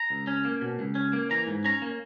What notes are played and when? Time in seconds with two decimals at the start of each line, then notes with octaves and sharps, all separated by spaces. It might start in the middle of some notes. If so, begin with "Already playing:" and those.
Already playing: A#5
0.10 C#2
0.27 C#4
0.45 A#3
0.61 B2
0.79 C#2
0.95 C#4
1.13 A#3
1.30 E3 A#5
1.47 G#2
1.64 C#4 A#5
1.82 A#3